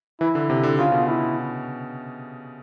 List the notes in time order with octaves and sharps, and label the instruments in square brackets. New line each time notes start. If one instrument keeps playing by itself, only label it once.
[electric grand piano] E3 [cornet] E4
[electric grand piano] D3
C3
D3
[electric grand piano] C#3 [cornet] F4
[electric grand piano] B2
[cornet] E4